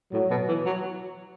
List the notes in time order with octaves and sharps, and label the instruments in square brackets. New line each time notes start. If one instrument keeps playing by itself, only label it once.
[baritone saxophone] A2 [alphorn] F#3
[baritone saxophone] B2
E3
F#3